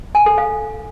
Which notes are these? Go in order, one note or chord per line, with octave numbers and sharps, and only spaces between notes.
G#5
A4
F5